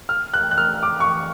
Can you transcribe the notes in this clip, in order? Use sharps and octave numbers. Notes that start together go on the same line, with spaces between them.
F6
F#6
F#6
F6
D6
C#6